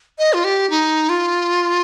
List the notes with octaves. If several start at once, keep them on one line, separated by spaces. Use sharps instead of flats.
D#5
F4
G4
D#4
F4